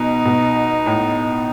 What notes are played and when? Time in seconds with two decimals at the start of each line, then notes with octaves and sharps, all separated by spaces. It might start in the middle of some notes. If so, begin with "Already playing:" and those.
Already playing: B2 D#4
0.25 B2
0.86 A2